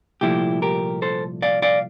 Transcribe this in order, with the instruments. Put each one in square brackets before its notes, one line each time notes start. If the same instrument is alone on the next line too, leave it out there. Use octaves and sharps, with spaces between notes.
[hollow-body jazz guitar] C2 A#2 F3 A3 E4 G4
G4 A#4
A4 C5
D5 F5
D5 F5